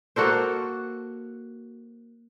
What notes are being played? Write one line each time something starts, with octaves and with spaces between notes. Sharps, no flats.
A#3 F#4 A4 C5